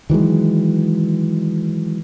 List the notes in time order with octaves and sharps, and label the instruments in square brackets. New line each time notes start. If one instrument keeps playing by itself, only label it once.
[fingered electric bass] D#3 E3 F#3 G#3